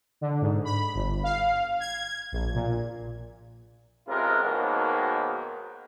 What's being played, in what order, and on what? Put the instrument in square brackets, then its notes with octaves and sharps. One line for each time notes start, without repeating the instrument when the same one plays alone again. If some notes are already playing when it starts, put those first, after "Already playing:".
[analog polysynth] D3
G#2
B5
G1
F5
G#6
A#1
A#2
[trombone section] A1 C3 G#3 F4 A#4
G#2 B2 D#3 F#3 A#3